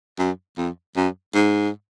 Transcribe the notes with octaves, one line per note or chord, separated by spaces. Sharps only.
F#2
F2
F#2
G#2